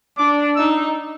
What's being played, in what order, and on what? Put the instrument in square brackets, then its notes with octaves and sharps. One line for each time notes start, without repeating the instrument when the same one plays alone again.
[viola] D4 [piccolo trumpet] D6
[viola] D#4 [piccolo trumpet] E6